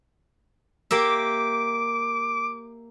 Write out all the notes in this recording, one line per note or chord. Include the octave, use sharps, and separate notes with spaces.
A#3 G4 E5 D6